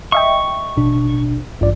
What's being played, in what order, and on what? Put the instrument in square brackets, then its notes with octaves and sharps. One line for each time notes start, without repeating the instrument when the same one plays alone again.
[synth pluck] D#5 E5 G5 [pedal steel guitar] C#6
[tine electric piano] A1 B2 D4
[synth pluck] A1 [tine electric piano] G2 F4 D5